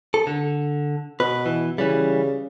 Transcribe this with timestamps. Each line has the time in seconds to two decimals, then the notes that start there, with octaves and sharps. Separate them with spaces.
0.14 A4
0.27 D3
1.20 B2 B4
1.46 E3
1.78 C#3 E3 G3